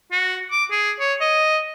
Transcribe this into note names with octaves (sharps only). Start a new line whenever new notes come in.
F#4
D6
G#4
C#5
D#5